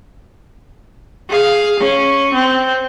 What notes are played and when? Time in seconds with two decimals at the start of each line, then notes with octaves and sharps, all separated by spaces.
1.29 G#4 F5
1.80 C#4
2.34 C4